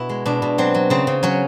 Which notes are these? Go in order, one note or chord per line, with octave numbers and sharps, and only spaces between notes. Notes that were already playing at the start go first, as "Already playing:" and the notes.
Already playing: B2 E4 F#4
G#3
B2 D4
B2
F#3 C4
F#3
C#3 C4
C#3
F#3 C#4